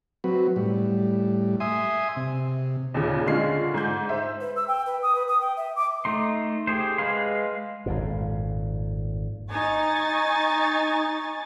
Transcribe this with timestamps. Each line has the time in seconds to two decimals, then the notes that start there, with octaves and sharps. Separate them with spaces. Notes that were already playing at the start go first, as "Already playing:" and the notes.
0.24 F#3 C4 F#4 B4
0.56 A2 G3
1.60 E5 G#5 C6 D#6
2.17 C3
2.94 D#2 A#2 C#3
3.26 D3 G#3 C#4 F4 C7
3.74 G#2 G6
4.09 C5 E5
4.41 B4
4.56 E6
4.68 G5
4.86 B4
5.03 D#6
5.15 B4
5.28 D#6
5.41 G5
5.57 E5
5.76 D6
6.05 A3 D#4 C6
6.67 G4 G#4 C5
6.98 G#3 G#4 B4 F5 C6
7.86 G#1 F2 A#2
9.51 D#4 G#5 C#6 A6